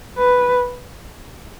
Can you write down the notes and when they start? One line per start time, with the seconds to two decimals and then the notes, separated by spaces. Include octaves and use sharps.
0.18 B4